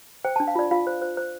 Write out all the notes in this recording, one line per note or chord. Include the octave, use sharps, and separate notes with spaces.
C5 G5
A5
D4
F5
F4 D5
F4 F5
C5
C5
C5